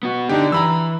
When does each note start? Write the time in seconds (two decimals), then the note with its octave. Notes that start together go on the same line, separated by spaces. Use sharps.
0.03 B3 F#4
0.29 D3 D4 D#4 G4
0.52 E3 A#5 B5 E6